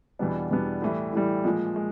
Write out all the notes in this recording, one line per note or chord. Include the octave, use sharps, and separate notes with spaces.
E2 B2 G3 B3 D4
E2 B2 G3 B3 D4
A2 E3 G3
A2 E3 G3
A#2 F3 G#3
G#3